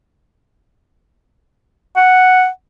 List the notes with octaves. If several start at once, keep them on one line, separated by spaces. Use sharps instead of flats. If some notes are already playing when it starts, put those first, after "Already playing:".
F#5